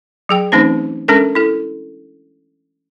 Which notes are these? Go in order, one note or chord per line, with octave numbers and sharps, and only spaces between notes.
F#3 G#4 G5
E3 A3 C4 C#4 D#4 C5
G#3 C#4 D4 A4 A#4
E4 A4